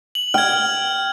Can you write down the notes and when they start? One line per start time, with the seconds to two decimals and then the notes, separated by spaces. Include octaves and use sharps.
0.15 F#7
0.34 G5 F6 G#6